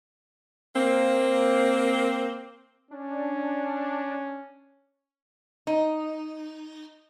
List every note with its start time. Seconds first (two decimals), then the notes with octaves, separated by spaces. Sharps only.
0.76 A#3 C4
2.91 C#4 D4
5.67 D#4